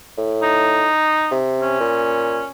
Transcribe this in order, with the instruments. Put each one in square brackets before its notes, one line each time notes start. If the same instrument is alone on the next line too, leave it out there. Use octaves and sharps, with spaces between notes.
[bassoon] A2
[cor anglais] D#4
[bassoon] C3
[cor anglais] C#4
[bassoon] A#2